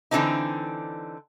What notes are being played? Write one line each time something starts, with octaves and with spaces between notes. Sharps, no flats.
D3 E3 G3 C4 D4 D#4